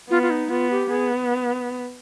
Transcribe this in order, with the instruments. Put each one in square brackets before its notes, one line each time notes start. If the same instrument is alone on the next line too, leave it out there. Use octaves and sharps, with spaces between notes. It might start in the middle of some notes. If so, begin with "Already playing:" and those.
[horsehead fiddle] B3 [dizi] F4
[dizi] F4
D#4
[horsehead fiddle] B3 [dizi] F4
[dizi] G4
[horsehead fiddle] B3 [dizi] G#4